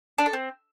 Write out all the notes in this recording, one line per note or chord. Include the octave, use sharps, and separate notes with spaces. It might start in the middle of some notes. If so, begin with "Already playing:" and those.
D4
A4
C4